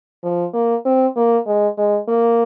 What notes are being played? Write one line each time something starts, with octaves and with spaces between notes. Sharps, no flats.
F3
A#3
C4
A#3
G#3
G#3
A#3